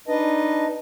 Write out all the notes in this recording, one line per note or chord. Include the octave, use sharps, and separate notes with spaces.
D4 D#4 B4 D#5 A5